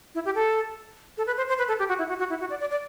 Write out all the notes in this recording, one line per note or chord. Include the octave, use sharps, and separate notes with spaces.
E4
G4
A4
A4
B4
C5
C5
B4
A4
G4
F#4
E4
F#4
F#4
E4
F#4
D5
D5
D5